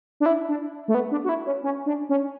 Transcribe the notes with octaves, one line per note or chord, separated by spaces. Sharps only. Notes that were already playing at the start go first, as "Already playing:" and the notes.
D4
E4
D4
A3
B3
D4
F#4
E4
C#4
C#4
D4
C#4